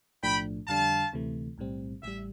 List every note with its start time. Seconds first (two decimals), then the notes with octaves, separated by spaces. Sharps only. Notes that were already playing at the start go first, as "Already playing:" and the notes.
0.23 B1 A2 F3 A3 D4 G5 B5
0.68 F2 D3 G3 D4 F5 A5
1.13 D2 C3 E3 A3
1.58 B1 A2 G3 C4
2.03 A1 A2 G3 E5